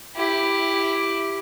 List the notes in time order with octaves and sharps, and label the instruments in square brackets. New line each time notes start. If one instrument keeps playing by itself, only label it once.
[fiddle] E4 G4